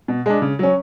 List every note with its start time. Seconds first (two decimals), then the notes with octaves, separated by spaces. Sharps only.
0.08 B2
0.26 G#3 D4
0.42 C#3
0.59 F#3 C#4